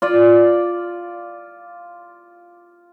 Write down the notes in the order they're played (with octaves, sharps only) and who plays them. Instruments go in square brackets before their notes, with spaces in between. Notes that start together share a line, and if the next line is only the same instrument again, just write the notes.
[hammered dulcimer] F4 D5